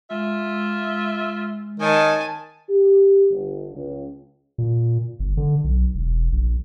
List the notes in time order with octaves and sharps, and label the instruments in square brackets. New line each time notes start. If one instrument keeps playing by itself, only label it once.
[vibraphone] G#3 [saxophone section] F4 E5
[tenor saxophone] D#3 [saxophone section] C#5 D#5 [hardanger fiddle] G#5 A5
[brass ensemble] G4
G1
C#2
[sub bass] A#2
G1
D3
B1
E1
A#1